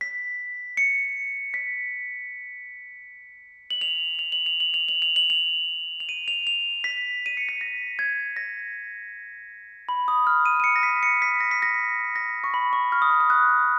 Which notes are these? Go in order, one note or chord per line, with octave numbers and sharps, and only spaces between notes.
B6
C#7
B6
F#7
F7
F7
F#7
F7
F#7
F7
F#7
F7
F#7
F7
F7
D#7
F7
F7
B6
D#7
C#7
B6
A#6
G#6
A#6
B5
D#6
F6
D#7
D#7
C#7
A#6
B6
C#7
B6
A#6
B6
A#6
A#6
C#6
B5
C#6
F6
D#6
C#6
D#6
F#6